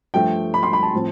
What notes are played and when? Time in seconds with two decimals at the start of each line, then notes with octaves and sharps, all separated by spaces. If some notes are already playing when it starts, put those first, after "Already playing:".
0.14 G2 F3 A3 G5
0.54 B5
0.63 C6
0.73 B5
0.83 A5
0.93 A2 F3 C4